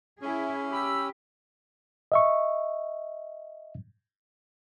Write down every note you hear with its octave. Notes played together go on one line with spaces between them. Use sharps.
C#4 E4 G#4
G4 B5 E6
D#5 E5 C#6